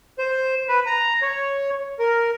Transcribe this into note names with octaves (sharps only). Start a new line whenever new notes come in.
C5
B4
A#5
C#5
A#4